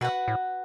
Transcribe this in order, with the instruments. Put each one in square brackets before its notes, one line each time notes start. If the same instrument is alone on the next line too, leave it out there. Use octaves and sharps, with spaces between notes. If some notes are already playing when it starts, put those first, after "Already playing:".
[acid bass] B2 [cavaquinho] F#4 B4 F#5
[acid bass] A2